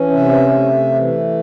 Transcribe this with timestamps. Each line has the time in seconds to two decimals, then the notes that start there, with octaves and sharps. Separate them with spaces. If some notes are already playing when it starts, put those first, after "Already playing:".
Already playing: E3 C#4
0.13 C3 E5
0.54 A3
0.94 E3